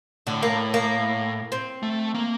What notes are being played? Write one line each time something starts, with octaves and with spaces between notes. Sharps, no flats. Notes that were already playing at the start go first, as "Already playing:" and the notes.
A2 D3
A#3
A#3
C4
A3
A#3